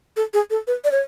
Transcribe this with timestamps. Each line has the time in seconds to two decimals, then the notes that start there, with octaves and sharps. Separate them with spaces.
0.17 A4
0.34 G#4
0.50 A4
0.67 B4
0.84 D5
0.92 C#5